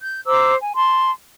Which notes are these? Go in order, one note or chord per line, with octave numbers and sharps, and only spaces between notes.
G6
C5 A#5 D6 E6
G#5
A5 C6